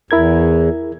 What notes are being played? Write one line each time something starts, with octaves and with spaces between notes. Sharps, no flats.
E2 E4 A#4 G#6